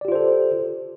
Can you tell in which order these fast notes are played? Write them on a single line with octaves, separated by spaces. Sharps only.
D5 G4 F4 C5 A4